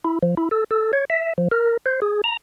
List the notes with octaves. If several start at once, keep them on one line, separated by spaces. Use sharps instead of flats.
E4
F3
E4
A4
A4
C#5
E5
F3
A#4
C5
G#4
A#5